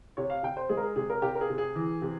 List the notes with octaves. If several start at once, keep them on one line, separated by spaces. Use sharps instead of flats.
C3 C#5
F5
C3 G5
C5
G#3 G#4
A#4
G#4
C3 G#4
A#4
C3 G4
A#4
G#4
C3
G#4
E3
C3